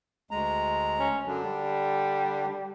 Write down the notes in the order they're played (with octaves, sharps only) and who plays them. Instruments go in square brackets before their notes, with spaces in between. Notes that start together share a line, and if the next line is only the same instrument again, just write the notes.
[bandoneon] D2 G#3 A#5
[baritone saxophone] C#4
[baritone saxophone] F#2 [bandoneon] D3 D4
[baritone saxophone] G3